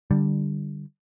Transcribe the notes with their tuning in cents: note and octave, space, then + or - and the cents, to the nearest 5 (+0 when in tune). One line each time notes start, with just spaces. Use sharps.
D3 +10 G3 +0